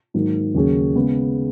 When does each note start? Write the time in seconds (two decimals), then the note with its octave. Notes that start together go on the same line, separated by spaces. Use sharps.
0.14 G#2 D#3 F#3 A#3
0.55 D#2 C#3 F#3 C#4 G#4
0.95 C#3 G#3 B3